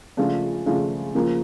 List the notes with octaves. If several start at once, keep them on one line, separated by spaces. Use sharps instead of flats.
C#3 F3 A3 D4 F4
C#3 F3 A3 D4 F4
C#3 F3 A#3